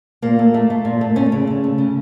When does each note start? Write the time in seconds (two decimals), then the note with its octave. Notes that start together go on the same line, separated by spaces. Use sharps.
0.22 A#2 A#3
0.39 A3
0.54 A3
0.70 A3
0.85 A#2
1.01 A3
1.16 A3 C#4
1.32 C#3
1.47 A3
1.64 A3
1.78 C#3